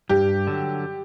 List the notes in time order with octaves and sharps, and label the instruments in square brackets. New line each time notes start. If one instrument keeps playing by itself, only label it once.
[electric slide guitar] G2 [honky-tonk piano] G4
[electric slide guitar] D3 F#3